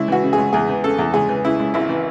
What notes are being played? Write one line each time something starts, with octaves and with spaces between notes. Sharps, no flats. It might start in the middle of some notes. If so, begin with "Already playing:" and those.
Already playing: C#2 E4
E3 F#4
C#3
G#4
C#2
E2 G#4
E3
C#3 A4
E2
C#2 G#4
E3
C#3 E4
C#2
G#1 E4
E3